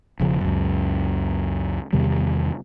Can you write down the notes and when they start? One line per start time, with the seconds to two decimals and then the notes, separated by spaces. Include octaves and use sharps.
0.20 E1 C#3 F3
0.41 C#2 F#2
1.93 E2 C3 D#3 G3